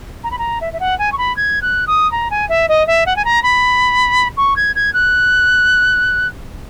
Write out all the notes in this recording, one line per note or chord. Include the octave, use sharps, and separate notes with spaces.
A#5
B5
A#5
E5
E5
F#5
G#5
C#6
B5
G#6
F#6
D#6
A#5
G#5
E5
D#5
E5
F#5
G#5
A#5
B5
C#6
G#6
G#6
F#6